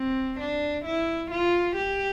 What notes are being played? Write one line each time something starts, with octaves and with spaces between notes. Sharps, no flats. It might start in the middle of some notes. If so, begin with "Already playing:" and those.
Already playing: C4
D4
E4
F4
G4